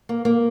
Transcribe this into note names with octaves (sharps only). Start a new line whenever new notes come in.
A#3
A#3